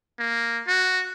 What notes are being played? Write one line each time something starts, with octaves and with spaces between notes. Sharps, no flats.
A#3
F#4